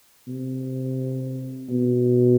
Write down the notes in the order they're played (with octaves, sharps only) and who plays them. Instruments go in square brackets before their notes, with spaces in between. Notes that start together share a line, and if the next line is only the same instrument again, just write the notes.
[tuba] C3
B2